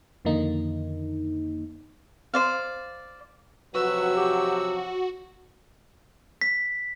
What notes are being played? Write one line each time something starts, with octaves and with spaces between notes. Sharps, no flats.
F2 D3 D#3 A#3 D#4
C5 D5 F5
C3 F3 F#3 F#4 B4 E6
G4
B6